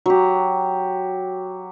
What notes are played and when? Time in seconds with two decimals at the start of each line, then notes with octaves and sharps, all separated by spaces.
0.06 F#3 G4